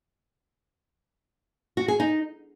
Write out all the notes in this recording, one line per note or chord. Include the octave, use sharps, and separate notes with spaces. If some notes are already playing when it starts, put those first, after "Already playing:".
F#4
G#4
D#4